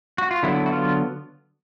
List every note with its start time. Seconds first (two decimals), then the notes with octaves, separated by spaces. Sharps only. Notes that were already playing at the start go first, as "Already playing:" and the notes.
0.18 F#4
0.31 F4
0.43 D3 F#3 B3 E4
0.66 F#4
0.72 F4